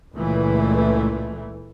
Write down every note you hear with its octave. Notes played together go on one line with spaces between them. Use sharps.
C#2 A#2 E3 A3